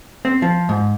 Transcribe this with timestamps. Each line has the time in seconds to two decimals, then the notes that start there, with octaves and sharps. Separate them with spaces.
0.25 C4
0.42 F3
0.69 G#2